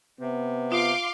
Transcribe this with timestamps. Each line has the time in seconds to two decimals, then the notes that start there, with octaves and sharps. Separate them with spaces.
0.20 C3 B3
0.72 F4 F5 C6 D6